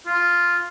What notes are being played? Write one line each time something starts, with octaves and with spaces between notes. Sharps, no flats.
F4